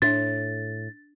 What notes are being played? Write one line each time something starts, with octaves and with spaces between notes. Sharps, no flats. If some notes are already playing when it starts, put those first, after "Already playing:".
A2 D4 A6